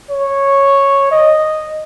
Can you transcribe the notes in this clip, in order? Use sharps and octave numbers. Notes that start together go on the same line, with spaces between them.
C#5
D#5